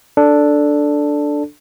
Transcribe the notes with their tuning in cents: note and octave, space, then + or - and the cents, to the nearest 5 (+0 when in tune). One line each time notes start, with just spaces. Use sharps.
D4 +0 A4 +0